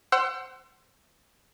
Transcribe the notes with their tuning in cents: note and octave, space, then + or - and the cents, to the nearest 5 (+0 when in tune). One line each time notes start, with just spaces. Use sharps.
C5 +5 F#5 +30 E6 +35